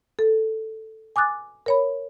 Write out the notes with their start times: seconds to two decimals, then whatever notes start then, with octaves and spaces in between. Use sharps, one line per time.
0.19 A4
1.16 G#5 D6 D#6 F#6 A6
1.66 A#4 C#5 B5